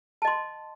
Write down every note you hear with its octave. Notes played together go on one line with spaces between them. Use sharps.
D#5 A5 C6